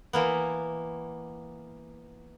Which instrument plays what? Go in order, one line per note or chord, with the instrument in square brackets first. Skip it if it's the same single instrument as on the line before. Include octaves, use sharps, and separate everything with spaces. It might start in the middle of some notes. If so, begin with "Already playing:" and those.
[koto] E3 A#3 B3